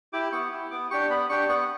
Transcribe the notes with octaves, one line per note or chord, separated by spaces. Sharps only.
E4 G4 D6
B3 C#6
E4 G4
B3 D6
D4 G4 C#6
B3 B5
D4 G4 C#6
B3 C#6